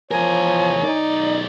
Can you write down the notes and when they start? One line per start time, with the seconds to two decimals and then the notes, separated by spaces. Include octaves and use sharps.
0.11 E2 F3 A#4 C#5 G#5
0.84 B1 D#4 D5